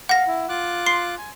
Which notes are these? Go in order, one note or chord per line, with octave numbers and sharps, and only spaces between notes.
F5 F#5 A#6
E4
F4 D6 F#6
C6 C7
G#5